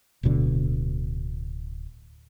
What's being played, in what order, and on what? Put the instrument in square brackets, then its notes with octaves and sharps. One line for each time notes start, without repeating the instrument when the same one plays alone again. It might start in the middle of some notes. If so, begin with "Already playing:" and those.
[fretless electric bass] D1 D2 B2 D3